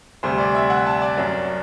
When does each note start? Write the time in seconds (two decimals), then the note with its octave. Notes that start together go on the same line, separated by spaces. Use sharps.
0.23 D2 C3 G3 C5
0.39 D5
0.55 E5
0.70 F#5
0.87 A5
1.02 D5
1.17 F#2 F#3